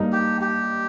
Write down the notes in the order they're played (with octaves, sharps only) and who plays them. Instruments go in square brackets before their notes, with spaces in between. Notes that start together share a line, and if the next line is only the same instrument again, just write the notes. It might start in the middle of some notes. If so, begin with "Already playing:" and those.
Already playing: [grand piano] G2 G3 A#3 D#4
[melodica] G4
G4